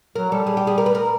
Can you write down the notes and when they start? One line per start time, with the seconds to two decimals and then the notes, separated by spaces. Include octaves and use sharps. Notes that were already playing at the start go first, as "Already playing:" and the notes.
0.15 F#3 A#4
0.31 G3 A4
0.47 G#4
0.57 G4
0.67 G#4
0.78 A#4
0.86 B4
0.95 A#4